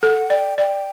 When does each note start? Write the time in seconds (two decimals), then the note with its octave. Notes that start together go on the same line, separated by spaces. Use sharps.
0.03 A4 F#5
0.30 D5 G5
0.58 D5 G5